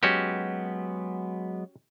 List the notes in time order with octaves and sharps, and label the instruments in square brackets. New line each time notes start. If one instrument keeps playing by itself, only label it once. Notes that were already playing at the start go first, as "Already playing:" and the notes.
[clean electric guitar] F#3 G#3 B3 [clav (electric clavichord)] C#4 F#4 G4